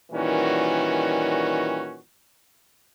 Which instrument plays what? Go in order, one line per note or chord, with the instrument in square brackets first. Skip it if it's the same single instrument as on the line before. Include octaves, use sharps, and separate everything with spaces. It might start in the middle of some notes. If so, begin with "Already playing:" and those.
[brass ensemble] A#2 D#3 E3 G3 C#4 F#4